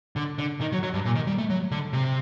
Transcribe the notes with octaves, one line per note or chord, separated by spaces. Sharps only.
D3
D3
D#3
F#3
F#3
G2
A#2
D#3
G3
A3
F#3
D3
C3